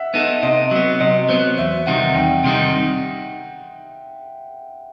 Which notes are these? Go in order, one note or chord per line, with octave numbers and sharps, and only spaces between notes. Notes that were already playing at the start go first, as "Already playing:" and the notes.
Already playing: E5 F#5
B3 D#4 A4
C3 D#5
F#3 B3
C3 D#5
F#3 B3 C5
E2 E5
C3 D#3 G3 D#4 F#5
E2 G5
C3 D#3 G3 D#4